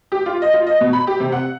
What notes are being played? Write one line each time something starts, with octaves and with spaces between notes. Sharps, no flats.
G4
F4
D#5
F4
D#5
B2
B5
G4
C3
F#5